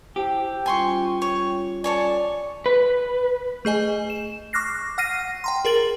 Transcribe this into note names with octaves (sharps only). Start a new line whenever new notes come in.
E4 G4 C5 G5 A5
G3 C#4 F4 G#5 C6 C#6
C#5
A4 C#5 D5 G#5
B4
A3 G#4 D#5 G#5
E7
C#6 D6 F6 F#6 A#6 C7
F#5 F6 A#6 C7 D#7
G5 A#5 C6
G#4 A#4 A6 F#7